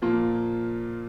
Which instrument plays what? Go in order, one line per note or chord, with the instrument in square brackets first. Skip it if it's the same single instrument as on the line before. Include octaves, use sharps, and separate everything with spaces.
[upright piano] A#2 F3 A#3 F4